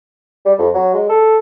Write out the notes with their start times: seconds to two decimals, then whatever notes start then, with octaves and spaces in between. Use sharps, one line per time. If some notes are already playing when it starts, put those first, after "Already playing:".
0.45 G3
0.59 F2
0.74 F#3
0.94 G#3
1.09 A4